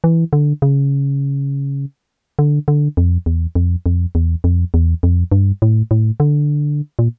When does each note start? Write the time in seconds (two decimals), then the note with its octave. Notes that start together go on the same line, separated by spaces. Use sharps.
0.04 E3
0.33 D3
0.62 C#3
2.39 D3
2.68 D3
2.97 F2
3.26 E2
3.55 F2
3.86 F2
4.15 E2
4.44 F2
4.74 E2
5.03 F2
5.32 G2
5.62 A2
5.91 A2
6.20 D3
6.99 A#2